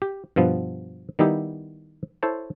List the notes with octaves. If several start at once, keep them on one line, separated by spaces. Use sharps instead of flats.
G4
G2 B2 F3 B3
D#3 G3 B3 D#4 E4 G4
E4 A4 C5 C#5 A5